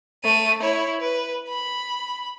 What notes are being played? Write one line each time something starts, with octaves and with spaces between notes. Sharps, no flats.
A3 D#7
E4 C#5
B4
B5